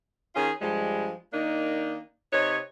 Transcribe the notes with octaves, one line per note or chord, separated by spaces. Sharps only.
D#3 C#4 F4 G#4
G2 F3 G3 G#3
D#3 A#3 D4 D#4
C3 D#4 B4 C#5